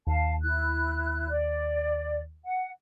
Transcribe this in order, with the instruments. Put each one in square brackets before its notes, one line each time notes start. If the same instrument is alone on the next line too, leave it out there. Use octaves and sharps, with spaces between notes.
[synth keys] D#2 [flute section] F5 A5
[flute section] E4 F#6
D5
F#5